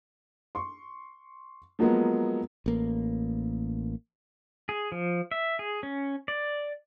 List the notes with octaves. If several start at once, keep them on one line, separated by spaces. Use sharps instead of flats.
C6 C#6
F3 F#3 G#3 A#3 B3
A1 A#3
G#4
F3
E5
G#4
C#4
D5